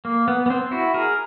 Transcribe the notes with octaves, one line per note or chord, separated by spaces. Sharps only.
A#3
B3
B3
C4
E4 F#4
G#4 A#4